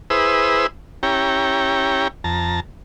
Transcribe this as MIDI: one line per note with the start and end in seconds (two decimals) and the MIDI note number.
0.10 0.67 64
0.10 0.67 68
0.10 0.67 71
0.10 0.67 72
0.10 0.67 87
0.10 0.67 88
1.03 2.08 61
1.03 2.08 64
1.03 2.08 67
1.03 2.08 73
1.03 2.08 79
1.03 2.08 82
2.24 2.60 41
2.24 2.60 81
2.24 2.60 82